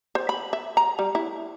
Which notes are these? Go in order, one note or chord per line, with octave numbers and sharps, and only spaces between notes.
C5
B5
E5
A#5
G3
E4